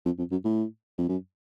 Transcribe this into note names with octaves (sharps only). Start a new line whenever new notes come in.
F2
F2
F#2
A2
F2
F#2